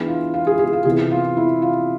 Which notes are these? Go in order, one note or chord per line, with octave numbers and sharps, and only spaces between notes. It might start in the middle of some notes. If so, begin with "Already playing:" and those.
Already playing: E3 B3 D4 G#4
F4
F4
G#4
G#4
F4
C3 E3 B3 E4 G#4
F4
E4
F4